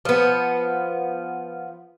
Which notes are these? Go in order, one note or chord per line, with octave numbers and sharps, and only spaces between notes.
F3 B3